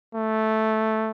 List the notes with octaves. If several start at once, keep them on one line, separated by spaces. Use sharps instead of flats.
A3